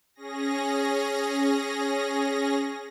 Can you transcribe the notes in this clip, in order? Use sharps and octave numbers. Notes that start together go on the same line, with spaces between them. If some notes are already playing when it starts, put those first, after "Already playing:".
C#4 G#4 A#6